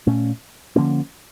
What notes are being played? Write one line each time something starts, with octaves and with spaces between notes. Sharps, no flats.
A#2 A3 C#4
D3 F3 A#3 C#4